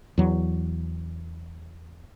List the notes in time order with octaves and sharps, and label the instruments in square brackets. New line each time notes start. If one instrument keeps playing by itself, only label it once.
[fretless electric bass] E2 F#3